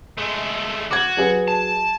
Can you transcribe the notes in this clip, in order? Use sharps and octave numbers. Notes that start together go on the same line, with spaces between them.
G#3 A3
F#4 D6 G#6
F#3 G#4 B4
A5